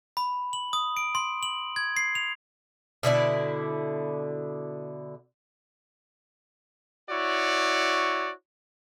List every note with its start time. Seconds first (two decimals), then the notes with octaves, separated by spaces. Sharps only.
0.17 B5
0.53 F#7
0.73 D#6
0.97 D7
1.15 C6
1.43 F#7
1.76 G#6
1.97 C7
2.15 F7
3.03 B2 D3 E4 D5
7.10 E4 F#4 C#5 D5